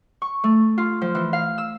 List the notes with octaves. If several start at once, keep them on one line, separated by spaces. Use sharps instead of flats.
C#6
A3
F4
F3
E3
F5
E6